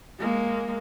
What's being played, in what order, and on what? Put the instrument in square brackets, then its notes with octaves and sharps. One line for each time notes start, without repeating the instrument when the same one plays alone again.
[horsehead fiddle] G#3 A#3